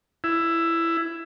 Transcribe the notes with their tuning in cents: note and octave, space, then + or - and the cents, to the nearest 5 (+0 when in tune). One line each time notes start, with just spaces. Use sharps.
E4 +15